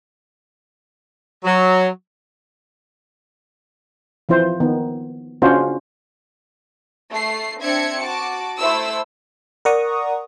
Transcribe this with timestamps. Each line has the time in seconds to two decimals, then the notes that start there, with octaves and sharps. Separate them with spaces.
1.44 F#3
4.29 E3 F3 E4 C5
4.60 D#3 B3
5.42 C#3 C#4 D4 F4 F#4 C5
7.11 A3 C7
7.62 C4 D4 E5 G#6 C#7
8.02 F#4 A5 D6
8.58 A3 E4 C5 E6
9.65 A#4 D5 F#5 A#5 C#6 D#6